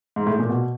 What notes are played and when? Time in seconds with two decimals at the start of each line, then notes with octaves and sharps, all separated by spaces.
0.16 G#2
0.27 A2
0.39 A#2
0.49 B2